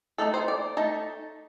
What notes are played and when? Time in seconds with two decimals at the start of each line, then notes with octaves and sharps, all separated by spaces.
0.18 A3 D#4 A4
0.34 C5
0.48 D5
0.77 A3 D#4 A5